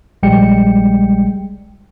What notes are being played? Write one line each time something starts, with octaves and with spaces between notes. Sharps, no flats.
A#1 G3 G#3 G5 C#7